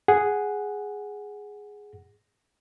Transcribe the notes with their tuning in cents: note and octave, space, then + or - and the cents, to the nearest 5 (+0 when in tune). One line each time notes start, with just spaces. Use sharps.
G#4 +0 F#5 +0